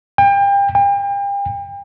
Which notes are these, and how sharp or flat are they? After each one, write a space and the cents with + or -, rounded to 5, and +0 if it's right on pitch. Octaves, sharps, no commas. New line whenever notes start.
G5 +35
G5 +40